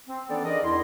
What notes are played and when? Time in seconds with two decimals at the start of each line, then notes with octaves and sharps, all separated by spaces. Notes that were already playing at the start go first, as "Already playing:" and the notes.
0.08 C4
0.30 E3 B3 C#4 D4 A4 D5
0.45 D#4 G#4 A#4 D5 D#5
0.63 E2 E4 C6